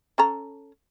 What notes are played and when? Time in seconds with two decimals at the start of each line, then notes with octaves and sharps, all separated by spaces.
0.18 C#4 A4 A#5